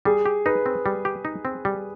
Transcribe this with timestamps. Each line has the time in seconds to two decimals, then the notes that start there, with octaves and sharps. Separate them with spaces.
0.05 G3 G#4
0.26 G4
0.46 D#4 B4
0.66 C4
0.86 G3
1.05 G4
1.25 D#4
1.45 C4
1.65 G3